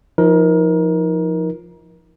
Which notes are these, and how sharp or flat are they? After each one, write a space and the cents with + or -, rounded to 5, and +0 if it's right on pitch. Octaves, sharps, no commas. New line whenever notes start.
F3 +0 D#4 +30 A#4 +25